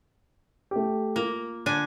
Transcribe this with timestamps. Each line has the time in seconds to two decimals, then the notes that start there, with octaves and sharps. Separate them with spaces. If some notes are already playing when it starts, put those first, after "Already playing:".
0.71 A3 G4
1.16 A#3 F4
1.66 D3 D4 G#5